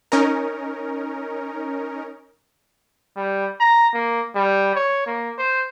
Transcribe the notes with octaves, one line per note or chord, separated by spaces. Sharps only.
C#4 D#4 A#4
G3
A#5
A#3
G3
C#5
A#3
C5